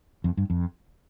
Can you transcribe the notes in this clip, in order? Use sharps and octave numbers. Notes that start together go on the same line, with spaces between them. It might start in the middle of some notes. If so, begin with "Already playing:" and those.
F2
G2
F2